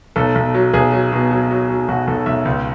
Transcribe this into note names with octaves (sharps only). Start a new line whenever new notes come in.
B1 A4
B1
F#3
B1 G#4
F#3
B2
F#3
F#3
F#3
B1 F#4
B1 A4
B1 E5
C#2